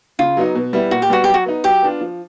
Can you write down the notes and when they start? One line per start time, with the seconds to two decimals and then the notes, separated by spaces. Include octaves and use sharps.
0.19 C#3 F4
0.37 F#3 B3 D#4
0.55 B2
0.73 G3 B3 E4
0.91 A#2 F#4
1.02 G4
1.10 G3 B3 F#4
1.24 F#3 G4
1.34 F#4
1.46 B3 D#4
1.64 F#3 G4
1.82 B3 D4 F4
2.01 F3